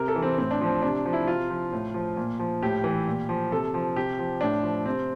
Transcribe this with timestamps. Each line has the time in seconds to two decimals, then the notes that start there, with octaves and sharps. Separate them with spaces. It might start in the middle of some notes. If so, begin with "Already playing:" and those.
Already playing: C3 A#4
0.08 A4
0.16 E3
0.22 C4
0.38 A2 C4
0.51 D4
0.61 F3 C4
0.82 C3 D4
1.05 F3
1.13 E4
1.27 C3 F4
1.50 F3
1.73 A2
1.94 F3
2.17 A#2
2.40 F3
2.62 A2 G4
2.84 E3
3.07 A#2
3.29 F3
3.52 C3 A4
3.74 F3
3.96 C3 G4
4.19 F3
4.41 A2 D4
4.63 F3
4.85 C3 C4